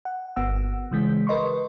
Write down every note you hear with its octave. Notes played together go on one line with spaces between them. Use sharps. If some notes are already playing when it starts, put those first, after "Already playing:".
F#5
G1 B3 F#5 E6
C#3 E3 G#3 G#4
A#4 B4 D#5 C6 C#6